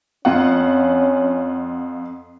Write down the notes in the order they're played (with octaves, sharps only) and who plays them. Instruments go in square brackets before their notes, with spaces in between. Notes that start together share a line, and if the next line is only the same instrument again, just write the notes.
[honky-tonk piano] F2 F4 F#5 [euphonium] C#4